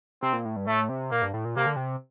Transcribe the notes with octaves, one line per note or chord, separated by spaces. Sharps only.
C3 C4
A#2
A2
G2
A2 A3
C3
A#2 A#3
G2
A2
A#2
C3 A#3
D3
C3